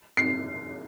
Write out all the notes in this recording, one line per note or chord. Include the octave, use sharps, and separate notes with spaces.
C7